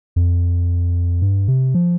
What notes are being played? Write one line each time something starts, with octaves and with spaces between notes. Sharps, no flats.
F2
G2
C3
F3